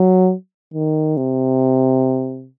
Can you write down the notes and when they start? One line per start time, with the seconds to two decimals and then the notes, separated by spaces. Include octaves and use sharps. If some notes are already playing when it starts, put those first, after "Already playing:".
Already playing: F#3
0.74 D#3
1.17 C3